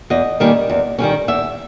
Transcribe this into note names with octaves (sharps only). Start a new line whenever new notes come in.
E2 D#5
D#3 G3 A#3 C#4
E2
D#3 G3 A#3 C#4
E2 E5